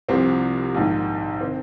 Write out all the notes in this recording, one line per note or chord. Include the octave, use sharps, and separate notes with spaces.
C2 C3 F3 C4
A#1 G#2 D#3
D#3 C4